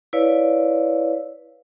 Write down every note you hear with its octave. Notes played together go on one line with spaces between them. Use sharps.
E4 B4 C#5 D5 F5